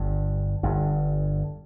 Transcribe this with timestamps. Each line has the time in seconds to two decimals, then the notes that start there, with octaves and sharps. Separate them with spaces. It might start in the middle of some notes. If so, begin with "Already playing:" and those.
Already playing: G1 G2
0.63 G1 G2